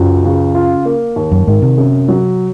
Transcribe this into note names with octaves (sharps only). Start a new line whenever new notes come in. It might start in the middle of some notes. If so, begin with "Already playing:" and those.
Already playing: C#2 F#2 F#3
C#3
F4
A#3
D#2
F#2
G#2 D#3
C3
F#2
F#3